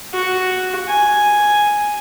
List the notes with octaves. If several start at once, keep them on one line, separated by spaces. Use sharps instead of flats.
F#4
G#5